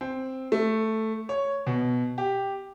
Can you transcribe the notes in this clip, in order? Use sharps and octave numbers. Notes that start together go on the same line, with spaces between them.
C4
A3
C#5
B2
G4